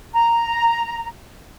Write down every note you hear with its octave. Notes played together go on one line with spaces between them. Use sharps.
A#5